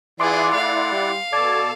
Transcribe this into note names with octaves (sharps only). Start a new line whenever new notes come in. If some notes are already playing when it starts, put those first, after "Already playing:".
E3 E4 F4 G#4 D5 F#5 C6 D6
A3 F5
G3
B2 A4 D5 A5 G#6